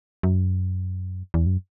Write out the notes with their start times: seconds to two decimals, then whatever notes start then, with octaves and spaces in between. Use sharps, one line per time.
0.23 F#2
1.34 E2
1.46 F#2